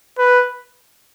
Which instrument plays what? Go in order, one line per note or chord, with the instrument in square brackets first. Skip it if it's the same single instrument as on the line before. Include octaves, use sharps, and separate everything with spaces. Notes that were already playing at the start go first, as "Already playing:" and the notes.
[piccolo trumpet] B4